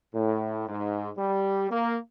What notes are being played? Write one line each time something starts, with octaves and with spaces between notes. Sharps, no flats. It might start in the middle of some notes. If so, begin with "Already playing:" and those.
A2
G#2
G3
A#3